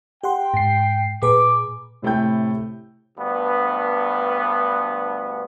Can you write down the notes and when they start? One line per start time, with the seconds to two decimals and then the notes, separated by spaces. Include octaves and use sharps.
0.23 G4 F#5 G5 C6
0.54 G#2 C7
1.22 A#2 G#4 B4 D6
2.02 A2 C3 A3 E4 G5 G6
3.18 D2 G2 B3